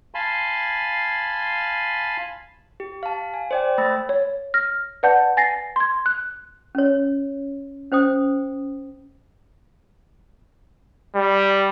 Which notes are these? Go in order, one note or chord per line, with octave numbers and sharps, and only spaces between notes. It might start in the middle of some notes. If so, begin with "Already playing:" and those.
F5 G#5 A5 B5 C6
G4
F5 A5
G#5
C5 D5 G5
A3 C5 B5 E6 A6
C#5
F6 A#6
B4 D5 F#5 A5 G6
G#5 A6 A#6 C7
C6 G#6
F#6
C#4 C#5
C#4 C5 G5 D#6
G3